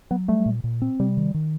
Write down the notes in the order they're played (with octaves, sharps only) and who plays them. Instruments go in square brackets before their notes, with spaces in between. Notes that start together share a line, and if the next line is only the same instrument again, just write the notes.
[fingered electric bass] F#3 [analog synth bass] B3
[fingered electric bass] G3 [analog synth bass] A3
[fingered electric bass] A#2
A#2
C4
[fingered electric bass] C3 [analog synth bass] G3
[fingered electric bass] D#3
D#3